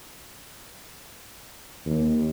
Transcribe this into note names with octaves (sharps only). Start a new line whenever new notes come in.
D#2